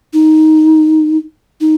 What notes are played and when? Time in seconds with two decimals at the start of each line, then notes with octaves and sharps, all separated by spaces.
0.14 D#4
1.61 D#4